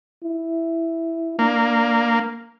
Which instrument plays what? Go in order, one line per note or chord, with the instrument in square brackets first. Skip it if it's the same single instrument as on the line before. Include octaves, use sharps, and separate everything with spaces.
[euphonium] E4
[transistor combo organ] A#3 [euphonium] D4